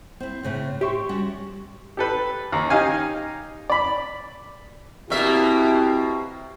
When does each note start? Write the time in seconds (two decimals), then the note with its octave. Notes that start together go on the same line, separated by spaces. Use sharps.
0.20 C4 E4
0.43 A2 C#3 C4
0.81 G4 E5 C6 C#6
1.09 G3 C#4 F#4
1.97 G4 A4 B4
2.52 D#2 A#4
2.70 D#4 G4 D#5 F5 G#5
3.70 D5 B5
5.10 B2 A#3 C4 E4 G4 E5